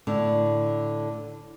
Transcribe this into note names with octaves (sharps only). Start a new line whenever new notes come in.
A2 D3